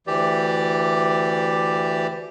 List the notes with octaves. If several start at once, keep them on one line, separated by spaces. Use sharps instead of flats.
D2 E3 G4 D5